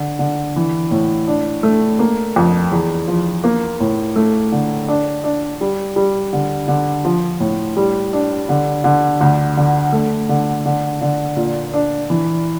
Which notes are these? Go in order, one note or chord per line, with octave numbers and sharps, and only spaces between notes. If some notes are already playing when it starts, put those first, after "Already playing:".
Already playing: D3
D3
E3
A2
D4
A3
A#3
F2
E2
F3
A#3
A2
A3
D3
D4
D4
G3
G3
D3
D3
F3
A2
G3
D4
D3
D3
D2
D3
A3
D3
D3
D3
A#2
D4
E3